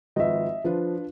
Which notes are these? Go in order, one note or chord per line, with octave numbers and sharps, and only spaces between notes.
G#1 F3 B4 D#5 E5
F3 D4 F4 B4